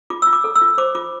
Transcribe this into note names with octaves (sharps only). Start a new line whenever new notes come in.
F4 D6
F4 E6
D6
A4
E6
F4
C5 D6
F4 D6